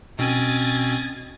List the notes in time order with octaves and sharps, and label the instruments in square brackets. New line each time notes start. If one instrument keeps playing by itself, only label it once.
[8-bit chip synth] B2 C4 C#4 [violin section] D#6 G#6 A6